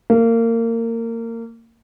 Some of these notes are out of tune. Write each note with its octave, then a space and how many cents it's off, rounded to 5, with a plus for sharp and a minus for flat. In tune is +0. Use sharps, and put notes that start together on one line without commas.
A#3 -25